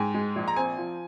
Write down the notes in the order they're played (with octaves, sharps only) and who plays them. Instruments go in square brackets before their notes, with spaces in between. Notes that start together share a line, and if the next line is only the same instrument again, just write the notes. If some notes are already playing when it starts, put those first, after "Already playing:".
Already playing: [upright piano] G#2 [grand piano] G5 G#5
[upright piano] G#3
A#1
[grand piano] A#5
[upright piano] C4 [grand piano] G#5
[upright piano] F3